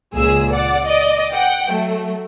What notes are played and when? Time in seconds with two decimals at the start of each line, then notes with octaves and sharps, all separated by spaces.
0.15 C#2 A#2 G#4 E6
0.52 D5 F#5
0.87 D5 D#5
1.33 F#5 G5
1.68 F#3 A3